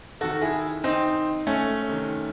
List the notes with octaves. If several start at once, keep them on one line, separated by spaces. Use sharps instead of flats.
C3 D#3 F#4 A4
E4 G#4
C4 D#4
A3 C#4
C3 D#3